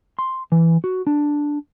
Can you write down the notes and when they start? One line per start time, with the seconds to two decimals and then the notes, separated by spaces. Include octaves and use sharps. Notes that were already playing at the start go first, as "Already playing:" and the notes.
0.19 C6
0.52 E3
0.84 F#4
1.07 D4